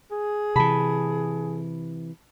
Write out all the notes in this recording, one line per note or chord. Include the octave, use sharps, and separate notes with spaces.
G#4
C3 E3 A5 B5